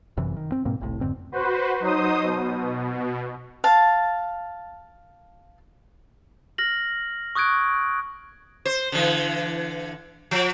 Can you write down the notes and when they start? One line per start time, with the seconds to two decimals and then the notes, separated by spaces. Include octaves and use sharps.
0.17 G1 F#2 C3 E3
0.37 D#3
0.52 C4
0.65 G#2 B2 A#3 C4
0.81 F#1 C2 A2
1.01 F2 G#2 D3 C4
1.32 F#4 B4 C5
1.80 F#3 D#4 C5 D#6
2.23 B2
3.64 F5 A5
6.58 F6 A#6 F#7
7.35 C#6 D#6 F#6 G#6 D7
8.65 C5
8.92 D3 E3
10.31 F3